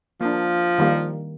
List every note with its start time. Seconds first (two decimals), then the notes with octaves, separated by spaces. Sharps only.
0.21 F3 A#3 D4
0.79 D#3 G3 A#3